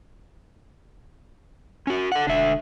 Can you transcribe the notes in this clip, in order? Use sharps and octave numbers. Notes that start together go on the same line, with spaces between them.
C#4 F#4
A4 F#5
E1 D3 E5